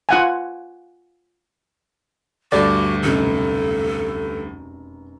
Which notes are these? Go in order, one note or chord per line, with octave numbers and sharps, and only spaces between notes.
F4 F#5 G#5
D2 G2 F#4 A4 D5
F1 F#2 B2 A4